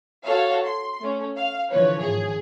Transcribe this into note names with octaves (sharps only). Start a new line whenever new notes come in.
F#4 A4 C#5 F5
C6
A3 C#4
F5
D3 E3 F3 B4 C#5
G#1 G#4